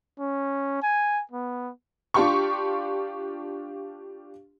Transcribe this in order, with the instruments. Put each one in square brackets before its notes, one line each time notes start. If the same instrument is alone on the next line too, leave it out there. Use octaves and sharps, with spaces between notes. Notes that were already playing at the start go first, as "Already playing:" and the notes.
[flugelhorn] C#4
G#5
B3
[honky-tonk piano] D4 F4 G4 C6 C#6